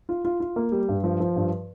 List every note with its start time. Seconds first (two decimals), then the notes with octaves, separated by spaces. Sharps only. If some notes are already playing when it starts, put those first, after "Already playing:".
0.09 F4
0.25 F4
0.40 F4
0.56 A#3
0.72 G3
0.89 G2
1.04 F3
1.20 F3
1.36 G2